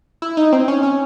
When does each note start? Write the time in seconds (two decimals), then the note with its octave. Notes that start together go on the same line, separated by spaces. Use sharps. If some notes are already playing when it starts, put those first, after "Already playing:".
0.22 E4
0.37 D#4
0.53 C4
0.68 C#4
0.83 C#4